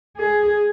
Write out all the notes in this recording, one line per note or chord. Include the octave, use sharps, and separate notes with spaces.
G#4